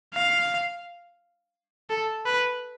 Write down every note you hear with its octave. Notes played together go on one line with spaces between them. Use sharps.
F5
A4
B4